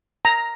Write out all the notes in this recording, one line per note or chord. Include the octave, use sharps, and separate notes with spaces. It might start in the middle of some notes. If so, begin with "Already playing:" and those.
A#5